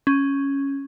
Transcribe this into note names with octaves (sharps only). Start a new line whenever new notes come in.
C#4